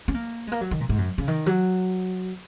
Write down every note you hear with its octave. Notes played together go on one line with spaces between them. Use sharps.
C#4
A#3
G#3
A#3
F#3
D#3
A#2
G#2
F#2
C#3
D#3
F#3